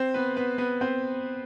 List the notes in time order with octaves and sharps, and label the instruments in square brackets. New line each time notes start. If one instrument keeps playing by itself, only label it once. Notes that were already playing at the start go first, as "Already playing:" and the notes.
Already playing: [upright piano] C4 C5
B3 B4
B3 B4
B3 B4
C4 C5